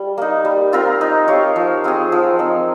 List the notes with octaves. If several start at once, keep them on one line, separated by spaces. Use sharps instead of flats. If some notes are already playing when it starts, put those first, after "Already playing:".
Already playing: G3
A#3 D#4
G3
C4 F4 A#4
D#4
G4 C#5 F5
F3
C4 F4 G#4
F3
C4 D#4